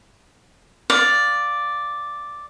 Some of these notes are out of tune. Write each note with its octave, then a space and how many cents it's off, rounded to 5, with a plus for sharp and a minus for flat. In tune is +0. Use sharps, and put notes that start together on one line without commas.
D5 +0 F5 +20